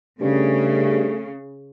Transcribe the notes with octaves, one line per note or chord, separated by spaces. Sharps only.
G2 C#3 A3